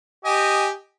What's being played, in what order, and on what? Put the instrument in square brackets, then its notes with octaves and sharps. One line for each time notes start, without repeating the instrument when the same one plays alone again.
[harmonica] G4 D#5 G#5